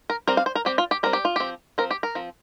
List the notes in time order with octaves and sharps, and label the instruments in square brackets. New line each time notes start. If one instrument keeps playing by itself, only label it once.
[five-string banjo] A#4
G3 C4 A#4
F5
C5
A#4
G3 C4 G4
F4
G4
G3 C4 A#4
G4
F4
F3 C4 G4
F3 C4 A#4
G4
A#4
F3 C4